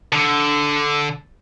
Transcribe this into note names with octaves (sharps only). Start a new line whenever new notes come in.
D3